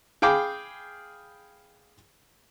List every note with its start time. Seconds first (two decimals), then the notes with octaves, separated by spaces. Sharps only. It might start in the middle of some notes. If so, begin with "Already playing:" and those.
0.22 G#4 F5 G5 B5 D6